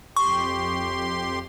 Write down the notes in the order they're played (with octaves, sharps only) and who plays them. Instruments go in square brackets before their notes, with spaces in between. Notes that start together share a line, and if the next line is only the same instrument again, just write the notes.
[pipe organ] F2 G4 C6 [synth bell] C#6